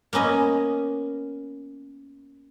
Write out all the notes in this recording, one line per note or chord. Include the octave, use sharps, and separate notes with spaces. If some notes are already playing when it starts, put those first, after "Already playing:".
A#3 B3 C#4 D#5